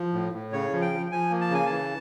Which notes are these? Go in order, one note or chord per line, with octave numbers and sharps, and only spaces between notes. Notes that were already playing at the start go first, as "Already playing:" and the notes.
Already playing: F3
A2
A2
C#3 C#5
F3
G5
F3
F3 G#5
A#3
A5
C#3 G#5
E3 A5